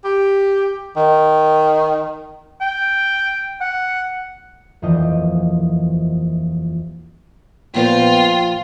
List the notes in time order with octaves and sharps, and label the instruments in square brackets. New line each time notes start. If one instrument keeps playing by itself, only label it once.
[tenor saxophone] G4
D#3
[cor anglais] G5
F#5
[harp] D#1 F2 E3 F3 D#5 G5
[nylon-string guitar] A#2 F3 C5 [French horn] B3 [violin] F4 [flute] G5